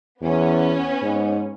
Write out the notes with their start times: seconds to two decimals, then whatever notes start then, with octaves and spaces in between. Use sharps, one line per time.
0.21 E2 B3 C#4
1.02 G#2